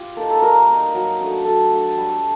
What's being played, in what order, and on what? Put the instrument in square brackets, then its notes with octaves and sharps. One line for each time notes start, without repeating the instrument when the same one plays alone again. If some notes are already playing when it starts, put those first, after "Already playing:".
Already playing: [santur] F4 G4
A#3 D#4 A4
A4
G3 A#4
A#3 D#4
F#3
A3 D4
F#3 A4
A3 D4
G3